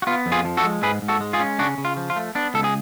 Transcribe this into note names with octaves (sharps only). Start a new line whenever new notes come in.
F#4
B3 F4
F2
F4 G#4
F3
F#4 A4
G#3
G#2 G#4 B4
G#2
F#4 A4
G#3
F4 G#4
C#4
C#3 D4 F#4
C#3
F4
F3
F4
A3
B3 D4
C#2 A4
G#4